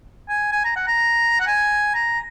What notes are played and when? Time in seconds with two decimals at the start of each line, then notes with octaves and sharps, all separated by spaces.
0.29 G#5
0.52 G#5
0.64 A#5
0.76 F#5
0.87 A#5
1.40 F#5
1.47 G#5
1.95 A#5